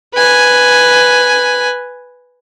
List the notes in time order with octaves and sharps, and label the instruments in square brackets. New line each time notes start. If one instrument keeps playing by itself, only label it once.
[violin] B4 G#5